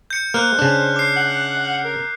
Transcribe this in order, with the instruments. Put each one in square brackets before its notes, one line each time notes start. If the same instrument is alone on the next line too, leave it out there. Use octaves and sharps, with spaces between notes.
[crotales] G6 C#7
[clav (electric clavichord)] A#3 [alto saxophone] C5 [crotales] F6 F#6
[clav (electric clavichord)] C#3 D4
[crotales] D6 C7
[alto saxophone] F#5
A#4